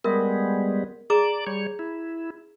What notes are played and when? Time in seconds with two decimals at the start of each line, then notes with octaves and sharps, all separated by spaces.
0.05 G3 G#3 B3 A#4 E5
1.10 G#4 D5 A#5 D6
1.47 G3 C#5
1.79 E4